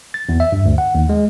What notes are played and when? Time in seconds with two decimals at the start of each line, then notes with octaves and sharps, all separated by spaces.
0.14 A6
0.29 E2
0.40 E5
0.52 G2
0.66 D2
0.78 F#5
0.95 D#2
1.09 G#3